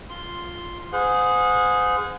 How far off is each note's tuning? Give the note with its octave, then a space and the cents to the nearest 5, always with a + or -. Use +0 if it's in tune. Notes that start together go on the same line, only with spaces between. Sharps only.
F4 +0 C6 +0
G#4 +0 C5 -40 F#5 -35